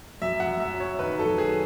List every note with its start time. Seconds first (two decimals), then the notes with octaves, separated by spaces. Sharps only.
0.22 F#2 E5
0.40 F#5
0.47 F#2
0.60 E5
0.74 F#3
0.80 C#5
0.99 D#3 B4
1.19 A4
1.26 F#2
1.38 G#4